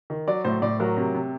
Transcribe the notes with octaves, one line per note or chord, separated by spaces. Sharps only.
D#3
F#3 D5
A2 C5
A2 D5
F#3 A#4
C3
C3